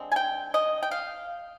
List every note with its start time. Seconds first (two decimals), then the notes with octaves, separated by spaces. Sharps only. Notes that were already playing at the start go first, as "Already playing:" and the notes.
Already playing: D3 G#3 C4
0.12 G#5
0.16 G5
0.54 D#5
0.82 G5
0.91 F5